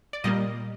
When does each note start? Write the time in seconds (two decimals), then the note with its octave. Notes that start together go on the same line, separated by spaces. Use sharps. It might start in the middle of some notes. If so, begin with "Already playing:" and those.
0.13 D5
0.24 A#2 G3 A#3 D#5